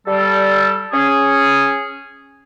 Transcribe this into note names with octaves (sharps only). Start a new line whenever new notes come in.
G3 A4
C#4 G#4